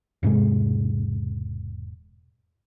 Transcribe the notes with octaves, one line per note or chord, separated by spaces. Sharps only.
E1 G#2 C3 G#3